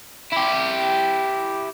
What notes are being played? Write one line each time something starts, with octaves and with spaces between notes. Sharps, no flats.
E4 G4